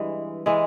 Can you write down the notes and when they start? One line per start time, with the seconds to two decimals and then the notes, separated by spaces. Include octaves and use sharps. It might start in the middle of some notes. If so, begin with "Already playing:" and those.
Already playing: G2 E3 G#3
0.46 E3 G#3